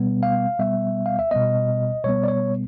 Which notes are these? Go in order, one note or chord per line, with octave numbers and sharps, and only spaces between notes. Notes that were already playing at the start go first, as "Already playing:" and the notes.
Already playing: B2 G3 B3
F5
B2 G3 B3 E5
F5
E5
B2 G3 B3 D#5
B2 G3 B3 C#5
D5
C#5